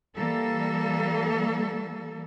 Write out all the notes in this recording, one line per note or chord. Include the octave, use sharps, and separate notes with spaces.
E3 G3 A#3 A4